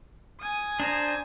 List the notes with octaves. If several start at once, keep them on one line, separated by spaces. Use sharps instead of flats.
G#5 D#6
D4 C5 A#5